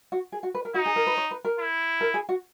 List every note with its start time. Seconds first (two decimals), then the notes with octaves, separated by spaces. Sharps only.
0.12 F#4
0.32 G#4
0.43 F#4
0.55 B4
0.65 A#4
0.74 D#4 F#4
0.86 G#4
0.96 A#4
1.07 B4
1.17 C#5
1.31 B4
1.45 A#4
1.58 E4
2.01 A#4
2.14 G#4
2.29 F#4